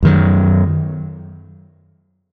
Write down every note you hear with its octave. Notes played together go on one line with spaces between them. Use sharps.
F#2 D#3 F#3